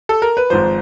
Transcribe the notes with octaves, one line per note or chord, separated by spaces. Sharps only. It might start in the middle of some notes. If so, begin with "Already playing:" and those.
A4
A#4
B4
G#1 G#2 F3 C5